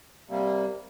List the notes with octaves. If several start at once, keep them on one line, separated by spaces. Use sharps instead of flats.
C3 G3 A#3